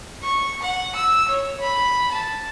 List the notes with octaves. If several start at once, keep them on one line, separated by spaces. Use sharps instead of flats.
C#6
F#5
E6
C#5
B5
A5